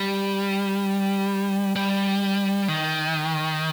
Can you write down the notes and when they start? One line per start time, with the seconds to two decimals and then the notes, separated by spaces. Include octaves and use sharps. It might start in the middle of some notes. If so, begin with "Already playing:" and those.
Already playing: G3
1.76 G3
2.68 D#3